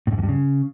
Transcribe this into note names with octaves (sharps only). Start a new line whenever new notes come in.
A2
G#2
F2
G2
C#3